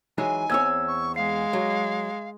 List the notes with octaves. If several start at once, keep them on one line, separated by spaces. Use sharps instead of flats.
E3 F#3 G#3 D#4 G#5
E2 C4 C#5 E6 G#6
C#6
G#3 F5 C7
F#3